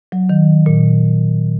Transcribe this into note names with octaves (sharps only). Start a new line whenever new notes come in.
F#3
D#3
A#2